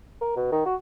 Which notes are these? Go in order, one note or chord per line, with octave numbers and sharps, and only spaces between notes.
A#4
B2
D#3
F#4